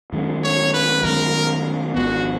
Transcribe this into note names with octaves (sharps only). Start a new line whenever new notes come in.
F#2 D#3 G#3
C#5
B4
F#2 D#3 G#3 A#4
G#1 F#2 F3 B3 F#4